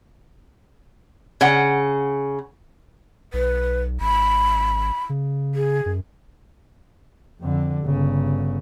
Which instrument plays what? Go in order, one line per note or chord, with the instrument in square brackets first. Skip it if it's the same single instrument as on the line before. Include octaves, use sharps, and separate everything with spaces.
[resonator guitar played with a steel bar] C#3 F#5
[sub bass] B1 [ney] B4
[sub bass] G#1 [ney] B5
[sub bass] C#3
[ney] G#4
[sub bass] F#2
[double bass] F2 D3
G1 C#3